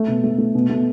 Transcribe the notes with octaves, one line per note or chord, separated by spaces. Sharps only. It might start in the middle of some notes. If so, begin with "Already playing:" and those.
Already playing: A3
B2
A3
A3
B2
A3